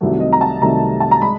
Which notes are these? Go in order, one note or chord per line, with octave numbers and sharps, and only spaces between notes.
C2 C3 D#3 F#3 A3
D#5
A#5
A5
C2 C3 D#3 F#3 A3 A#5
A5
A#5
G#3 B5